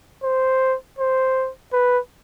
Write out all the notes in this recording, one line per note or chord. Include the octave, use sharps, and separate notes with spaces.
C5
C5
B4